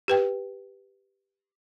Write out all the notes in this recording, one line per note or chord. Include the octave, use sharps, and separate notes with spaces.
G4 B4 G5